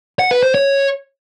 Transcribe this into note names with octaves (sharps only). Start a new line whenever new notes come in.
F#5
B4
C5
C#5